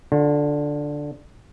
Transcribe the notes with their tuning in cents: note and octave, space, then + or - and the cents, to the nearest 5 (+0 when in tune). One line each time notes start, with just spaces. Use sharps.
D3 +0 F4 +35